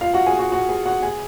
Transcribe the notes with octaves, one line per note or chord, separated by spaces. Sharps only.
F4 F5
F#4 F#5
G#4 G#5
F#4 F#5
F#4 F#5
G#4 G#5
F#4 F#5
G#4 G#5